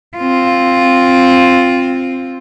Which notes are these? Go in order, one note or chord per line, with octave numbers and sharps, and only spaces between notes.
C4 F4